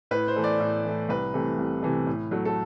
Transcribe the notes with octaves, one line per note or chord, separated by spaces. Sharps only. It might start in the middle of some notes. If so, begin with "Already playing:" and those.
A2 B4
C5
E3 A3
D5
A2
E3 A3
C2 B4
C3 E3 A3
C2
C3 E3 A3
A2
F#3 A3
A4